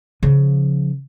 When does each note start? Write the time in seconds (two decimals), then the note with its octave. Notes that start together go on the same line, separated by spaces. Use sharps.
0.23 C#3 F3